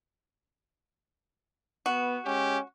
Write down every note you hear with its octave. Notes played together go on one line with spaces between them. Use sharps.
B3 F#4
G#3 C#4 G4